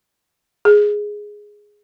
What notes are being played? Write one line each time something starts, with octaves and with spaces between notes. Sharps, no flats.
G#4